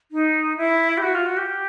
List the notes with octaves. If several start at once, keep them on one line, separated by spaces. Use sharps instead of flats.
D#4
E4
G4
F#4
F4
F#4
G4